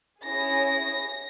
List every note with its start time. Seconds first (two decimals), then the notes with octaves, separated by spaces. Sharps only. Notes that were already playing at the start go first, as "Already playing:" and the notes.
0.23 C#4 E4 G#4 A#6